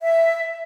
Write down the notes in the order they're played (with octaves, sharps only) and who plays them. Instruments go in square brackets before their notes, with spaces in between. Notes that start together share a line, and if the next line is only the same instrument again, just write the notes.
[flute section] E5